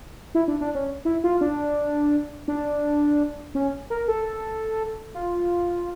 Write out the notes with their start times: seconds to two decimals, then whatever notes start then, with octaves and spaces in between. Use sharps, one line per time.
0.35 E4
0.48 D4
0.61 D4
0.75 C#4
1.05 E4
1.24 F4
1.41 D4
2.48 D4
3.55 C#4
3.90 A#4
4.08 A4
5.14 F4